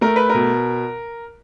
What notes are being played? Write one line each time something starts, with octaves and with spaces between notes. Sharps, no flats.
A3 A#4
B4
B2 A#4